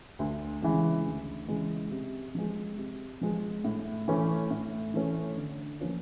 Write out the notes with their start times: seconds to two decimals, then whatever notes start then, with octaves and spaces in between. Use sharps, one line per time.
0.19 D2
0.62 C#3 E3 G#3
1.06 D2
1.48 C#3 E3 G#3
1.91 C3
2.35 F3 G#3
2.77 C3
3.21 F3 G#3
3.64 A2
4.08 E3 A3 C#4
4.51 A2
4.94 E3 A3 C#4
5.37 D3
5.80 F3 A#3 C#4 F4